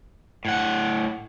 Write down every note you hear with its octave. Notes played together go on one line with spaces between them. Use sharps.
A2 F#5